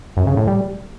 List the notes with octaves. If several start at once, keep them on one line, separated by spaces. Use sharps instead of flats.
F#2
C#3
A2
G3